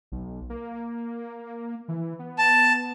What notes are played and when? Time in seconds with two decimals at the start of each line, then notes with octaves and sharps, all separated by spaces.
0.12 B1
0.50 A#3
1.88 E3
2.19 B3
2.38 A5